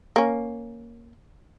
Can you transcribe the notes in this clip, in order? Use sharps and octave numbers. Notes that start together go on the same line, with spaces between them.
A#3 C#4